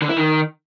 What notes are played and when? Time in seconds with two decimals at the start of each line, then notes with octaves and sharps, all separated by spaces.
0.02 D3
0.09 E4
0.17 D#3